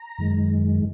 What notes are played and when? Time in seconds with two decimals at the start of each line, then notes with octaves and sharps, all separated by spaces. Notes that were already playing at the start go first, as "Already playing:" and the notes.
Already playing: A#5
0.18 F#2 D#3 G#3